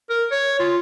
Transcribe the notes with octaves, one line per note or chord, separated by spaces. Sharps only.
A#4
C#5
F4